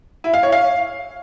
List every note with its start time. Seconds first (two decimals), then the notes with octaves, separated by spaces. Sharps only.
0.24 E4
0.34 F5
0.43 C#5
0.52 F5